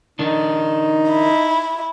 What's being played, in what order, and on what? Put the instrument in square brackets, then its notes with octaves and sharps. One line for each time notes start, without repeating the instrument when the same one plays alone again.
[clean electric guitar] D#3 D4 [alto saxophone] D#4
[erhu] E4